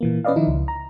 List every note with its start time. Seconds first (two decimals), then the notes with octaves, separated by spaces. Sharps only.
0.01 A#2 E3 A#3
0.24 C#4 B4 D5 D#5 F5
0.36 D#3 F3 D#4 E4
0.48 C#2
0.68 A#5